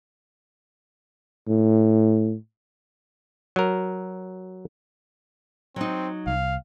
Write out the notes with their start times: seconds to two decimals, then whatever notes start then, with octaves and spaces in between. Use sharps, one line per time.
1.48 A2
3.56 F#3 A#4
5.76 F#3 C4 D#4
6.27 C2 F5